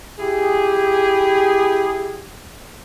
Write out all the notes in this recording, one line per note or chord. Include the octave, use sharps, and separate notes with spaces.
E4 G4 G#4